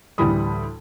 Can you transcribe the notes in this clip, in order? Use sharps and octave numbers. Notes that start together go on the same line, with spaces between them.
D2 A2 E3 G3 B5 D#6